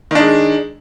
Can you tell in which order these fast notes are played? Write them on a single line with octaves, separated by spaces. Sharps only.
D#3 D4 G#3